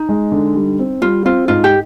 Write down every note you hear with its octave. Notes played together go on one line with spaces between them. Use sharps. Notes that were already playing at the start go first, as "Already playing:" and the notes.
Already playing: D#4
G#3
D3
G3
C4
G3 F4
C4 F4
G#2 F4
G4